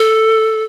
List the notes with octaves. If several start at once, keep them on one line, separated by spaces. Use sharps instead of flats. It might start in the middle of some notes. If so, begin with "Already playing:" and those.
Already playing: A4